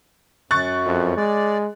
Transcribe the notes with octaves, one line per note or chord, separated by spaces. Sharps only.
F#2 C#6 F#6 A6
F2
G#3 D5